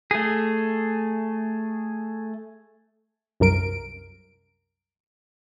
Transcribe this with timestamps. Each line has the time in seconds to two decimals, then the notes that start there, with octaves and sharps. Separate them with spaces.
0.11 A3 G#4
3.40 C2 F#2 A#4 D7